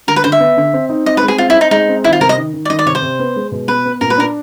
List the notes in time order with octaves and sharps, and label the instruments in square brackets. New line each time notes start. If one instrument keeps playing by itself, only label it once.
[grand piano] D3 [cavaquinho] A#4
[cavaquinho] B4
[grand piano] D3 [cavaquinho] C5
[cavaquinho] E5
[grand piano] B3
D3
C4
D#4
[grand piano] C4 [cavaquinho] D#5
[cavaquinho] B4
[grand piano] G#3
[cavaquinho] G#4
[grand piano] C4 [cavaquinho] F4
[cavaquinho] E4
[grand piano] C4
[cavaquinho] D#4
[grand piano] G#3 [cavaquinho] D#4
[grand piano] C4
[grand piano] D#3 [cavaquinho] E4
[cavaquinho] F4
[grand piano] C3 [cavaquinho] A#4
[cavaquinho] D#5
[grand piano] D#3
D#3
[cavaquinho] D5
[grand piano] D#3 [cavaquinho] D#5
[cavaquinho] D5
[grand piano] C3 [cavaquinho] C#5
[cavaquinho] C5
[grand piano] C3
B3
G#3
B2
[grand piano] B3 [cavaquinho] B4
[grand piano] B3
[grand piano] A#2 [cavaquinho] A#4
[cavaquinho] B4
[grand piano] D4 [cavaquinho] A#4